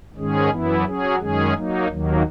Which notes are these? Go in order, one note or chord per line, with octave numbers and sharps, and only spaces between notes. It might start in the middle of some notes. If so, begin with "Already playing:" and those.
G#2 D#3 G#3 C#4 G#4
F#2 E3 B3 E4
F#3 C#4 G#4
F#2 D#3 G#3 C#4 G#4
F#3 A#3 D#4
D#2 D#3 F#3 A#3